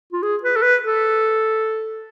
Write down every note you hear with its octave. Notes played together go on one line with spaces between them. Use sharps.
F4
G#4
B4
A4
B4
A4